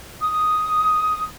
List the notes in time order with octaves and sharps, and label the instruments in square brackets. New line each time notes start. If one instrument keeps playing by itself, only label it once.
[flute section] D#6